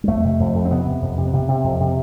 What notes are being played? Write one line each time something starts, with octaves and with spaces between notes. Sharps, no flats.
G3
F2 A3
C3
F2
F2
C4
C3 B3
C3
F2
C3
C3
C3
F2
C3